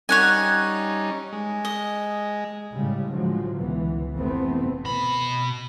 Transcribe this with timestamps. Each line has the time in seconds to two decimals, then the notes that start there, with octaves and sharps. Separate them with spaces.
0.09 G3 C#4 D#4 C#5 F#5 G#5
1.33 G#3
1.65 D#5
2.72 A2 C#3 G3 G#3
3.11 A2 D3 F3 F#3 G#3
3.56 C#2 E3 B3
4.16 F1 E3 A3 B3 C4
4.85 B2 B5